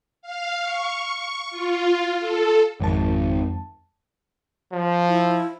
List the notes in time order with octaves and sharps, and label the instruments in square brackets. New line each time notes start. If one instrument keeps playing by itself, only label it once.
[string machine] F5
C#6
F4
A4
[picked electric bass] G#1 [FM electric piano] F2 A5
[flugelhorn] F3
[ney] E4